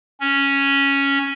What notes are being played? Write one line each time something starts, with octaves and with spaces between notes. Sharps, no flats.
C#4